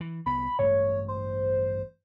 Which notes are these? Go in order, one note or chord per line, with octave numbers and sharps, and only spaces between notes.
E3
C2 B3 B5
A1 G2 A3 C#5
C5